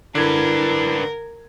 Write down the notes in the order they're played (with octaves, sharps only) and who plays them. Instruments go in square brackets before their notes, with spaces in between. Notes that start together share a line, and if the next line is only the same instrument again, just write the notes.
[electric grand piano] D3 G#6 [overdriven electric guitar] D4 B4 [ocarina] E4 [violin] A#4